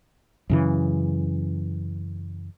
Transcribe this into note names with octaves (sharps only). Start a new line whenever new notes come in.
F#2 C#3 E3